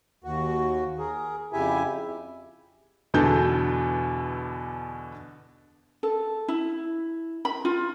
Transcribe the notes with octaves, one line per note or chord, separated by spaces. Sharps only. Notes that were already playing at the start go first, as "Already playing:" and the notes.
D#2 F#4
G#4 A#4
F2 C#3 E4 G4 E5 G#5
E2 B2 D3 A4 G6
A4
E4
B5
F4